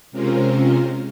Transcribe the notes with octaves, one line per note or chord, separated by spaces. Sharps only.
C3 G#3 C4 C#4 F4 A#4